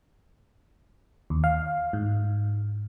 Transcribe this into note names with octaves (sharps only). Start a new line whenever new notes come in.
D#2
F5
G#2